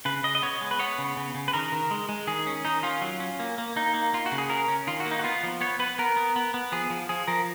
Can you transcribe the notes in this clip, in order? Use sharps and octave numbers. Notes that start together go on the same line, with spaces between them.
C#3 B4
C#3 D#5
D#5
B3 C#5
G#3
B4
B3 C#5
C#3
C#3
C#3
B4
D#3 A#4
D#3
G#3
G#3
D#3 G#4
C#4
D#3 D#4
C#4 F4
F#3
C#4
A#3
A#3
A#3 D#4
A#3
A#3 F4
F#4
C#3
G#4
C#4 A#4
C#4
D#3 F4
F#4
A#3
D#4
F#4
B3 F4
F3
B3 C#5
B3 B4
B3 A#4
B3
B3
B3
F3 G#4
F3
F3 G#4
F3 A#4